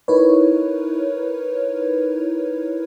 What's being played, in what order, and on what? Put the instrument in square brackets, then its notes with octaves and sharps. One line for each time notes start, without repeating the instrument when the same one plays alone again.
[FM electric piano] D#4 E4 A#4 B4 C#5